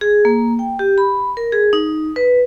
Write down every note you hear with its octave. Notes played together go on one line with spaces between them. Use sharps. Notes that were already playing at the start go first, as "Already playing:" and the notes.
G#4
A#3
G5
G4
B5
A#4
G#4
D#4
B4